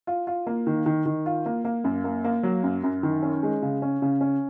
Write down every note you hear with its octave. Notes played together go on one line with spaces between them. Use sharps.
F4
F4
A#3
D#3
D#3
D#3
F4
A#3
A#3
F#2
A#3
A#3
F#3
F#2
F#2
D#3
C#4
G#3
C#3
C#4
C#3
C#4